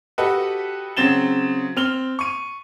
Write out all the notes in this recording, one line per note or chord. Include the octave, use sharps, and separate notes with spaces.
F#4 G4 A4 B4 D#5 G5
C#3 F#3 C4 A6 E7 G7
C4 F6 F7 G7
C#6 D#7